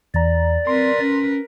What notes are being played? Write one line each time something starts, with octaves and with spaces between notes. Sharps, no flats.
E2 D5 A#5
C4 A#4 B4 C6
C#4